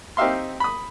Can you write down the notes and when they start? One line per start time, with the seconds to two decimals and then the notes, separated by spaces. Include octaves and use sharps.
0.17 C4 D#4 G4 E5 F5 C6
0.60 B5 D#6